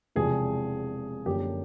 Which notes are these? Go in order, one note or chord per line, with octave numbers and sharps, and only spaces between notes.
E1 E2 C3 F3 G#4
F#2 D3 F3 A#3 G4